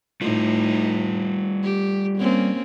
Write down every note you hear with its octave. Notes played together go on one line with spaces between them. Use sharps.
A2 G3 A3 D#4 F4
G4
A#3 C4 C#4